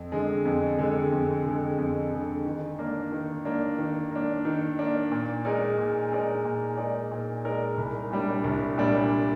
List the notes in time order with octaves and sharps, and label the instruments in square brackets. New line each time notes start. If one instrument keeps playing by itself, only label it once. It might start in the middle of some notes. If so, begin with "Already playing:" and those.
Already playing: [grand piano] F2
D3 G#3
F2
D3 G#3
F2
D3 G#3
F2
D3 G#3
D#3
A#3 D4
D#3
A#3 D4
D#3
A#3 D4
D#3
A#3 D4
A#2
G#3 D#4 A#4 D5
A#2
G#3 D#4 A#4 D5
A#2
G#3 D#4 A#4 D5
A#2
G#3 D#4 A#4 D5
C2
A#2 G3 D4
C2
A#2 G3 D4